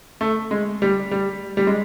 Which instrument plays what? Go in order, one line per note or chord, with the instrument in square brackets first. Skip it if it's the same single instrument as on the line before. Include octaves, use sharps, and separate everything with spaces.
[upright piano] A3
G#3
G3
G3
G3
G#3